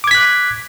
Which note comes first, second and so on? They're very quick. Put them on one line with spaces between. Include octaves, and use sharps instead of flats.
D6 G#6 B6 F#6